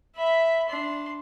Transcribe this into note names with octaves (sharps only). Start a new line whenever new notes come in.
E5 B5
D4 C6